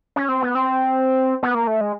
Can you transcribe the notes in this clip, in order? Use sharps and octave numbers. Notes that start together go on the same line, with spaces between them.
C#4
C4
B3
C4
B3
A#3
A3
G#3